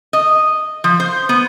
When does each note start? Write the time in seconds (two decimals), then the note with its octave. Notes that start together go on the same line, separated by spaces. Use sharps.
0.13 D#5
0.84 F3
1.00 C5
1.29 B3